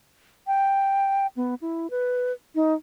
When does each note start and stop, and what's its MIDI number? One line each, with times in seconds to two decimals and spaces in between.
0.47 1.27 79
1.37 1.55 59
1.62 1.90 64
1.91 2.32 71
2.55 2.74 63